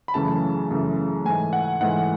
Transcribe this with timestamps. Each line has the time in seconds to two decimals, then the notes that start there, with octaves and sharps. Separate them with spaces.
0.08 B5
0.14 F#2 C#3 E3 A3 A5
0.71 F#2 C#3 E3 A3
1.25 G#2 E3 A3 G#5
1.53 F#5
1.81 G#2 E3 A3 F#5